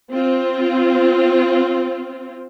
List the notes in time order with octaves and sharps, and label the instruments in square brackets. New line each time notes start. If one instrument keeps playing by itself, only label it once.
[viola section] C4 F4